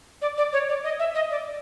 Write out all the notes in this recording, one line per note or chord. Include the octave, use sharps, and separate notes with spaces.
D5
D5
C#5
D5
D#5
E5
D#5
D5